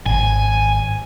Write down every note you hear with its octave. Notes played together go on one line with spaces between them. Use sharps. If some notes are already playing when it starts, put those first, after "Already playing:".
G#1 G#5